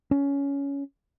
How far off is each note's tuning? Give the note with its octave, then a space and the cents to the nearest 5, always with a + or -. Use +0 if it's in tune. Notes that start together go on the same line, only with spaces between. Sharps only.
C#4 +15